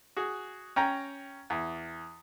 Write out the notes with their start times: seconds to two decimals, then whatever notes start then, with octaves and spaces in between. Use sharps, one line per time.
0.17 F#4 G#4
0.76 C#4 G5 A#5
1.50 E2